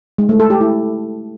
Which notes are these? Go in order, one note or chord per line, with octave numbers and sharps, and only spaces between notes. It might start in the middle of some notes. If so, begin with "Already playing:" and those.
G#3
A3
A4
G4
E4